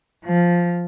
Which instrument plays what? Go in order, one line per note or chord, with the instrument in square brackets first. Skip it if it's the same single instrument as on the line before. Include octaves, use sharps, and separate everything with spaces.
[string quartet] F3